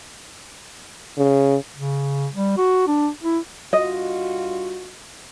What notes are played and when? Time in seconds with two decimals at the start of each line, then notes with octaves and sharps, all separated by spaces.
1.18 C#3
1.76 C#3
2.33 G3
2.57 F#4
2.87 D4
3.23 E4
3.73 G2 F4 F#4 D#5